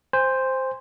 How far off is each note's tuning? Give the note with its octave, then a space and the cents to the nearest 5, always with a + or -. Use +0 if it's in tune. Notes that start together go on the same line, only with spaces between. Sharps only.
C5 +0 G#5 -35